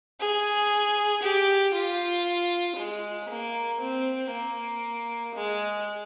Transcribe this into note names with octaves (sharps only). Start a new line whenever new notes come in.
G#4
G4
F4
G#3
A#3
C4
A#3
G#3